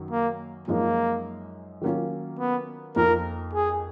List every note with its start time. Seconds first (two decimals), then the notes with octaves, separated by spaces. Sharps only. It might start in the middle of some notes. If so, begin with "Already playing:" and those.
Already playing: F#2 D#3 F#3
0.11 A#3
0.68 F#2 F3 G#3 A#3 D#4
1.81 D#3 F#3 A#3 C#4 F4
2.39 B3
2.96 F2 F3 A#3 D#4 A#4
3.54 G#4